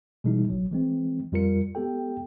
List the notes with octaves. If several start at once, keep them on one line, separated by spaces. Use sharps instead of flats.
B2 E3 G3 G#3 D#4 E4
A1 F#3
E3 G#3 C4
F2 G3 F4 A#4 C#7
G#3 B3 G4 A4 G5